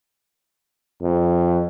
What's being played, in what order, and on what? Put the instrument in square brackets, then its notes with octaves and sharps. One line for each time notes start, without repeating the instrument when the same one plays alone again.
[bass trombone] F2